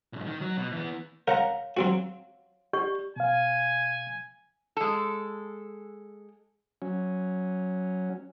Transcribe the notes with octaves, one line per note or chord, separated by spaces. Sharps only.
B1 G#2
D#3
F#3
B2
E3 B3
A#4 C#5 F5 F#5 A#5
F#3 C4 F#4
G4 D5 C#6
B2 F5 G#5
G#3 A4
F#3 C#4